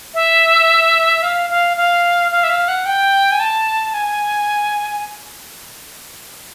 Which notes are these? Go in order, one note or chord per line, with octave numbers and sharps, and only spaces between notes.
E5
F5
F5
F5
F5
E5
F5
F#5
G5
G#5
A5
G#5